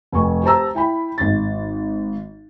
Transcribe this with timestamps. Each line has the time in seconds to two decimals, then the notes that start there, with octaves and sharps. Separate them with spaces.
0.12 F1 G#5 C#6
0.43 G4 C5 A5 A#5 E6
0.75 E4 G5 B5
1.18 G#1 A6